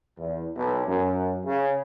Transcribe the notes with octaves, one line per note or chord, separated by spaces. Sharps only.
E2
B1
F#2
C#3